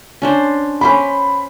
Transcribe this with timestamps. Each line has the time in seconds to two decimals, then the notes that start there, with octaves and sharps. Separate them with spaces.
0.22 C#4 D4 C5
0.81 C#4 C5 B5 D6